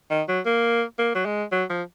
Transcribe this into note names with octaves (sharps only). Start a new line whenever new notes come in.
D#3
F#3
A#3
A#3
F#3
G#3
F#3
F3